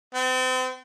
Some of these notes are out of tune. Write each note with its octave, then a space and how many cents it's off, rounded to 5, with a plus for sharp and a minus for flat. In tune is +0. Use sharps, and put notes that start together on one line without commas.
C4 -35